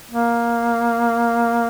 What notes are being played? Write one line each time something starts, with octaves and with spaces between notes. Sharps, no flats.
A#3